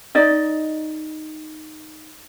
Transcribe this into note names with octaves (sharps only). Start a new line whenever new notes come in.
D#4 D5 D#5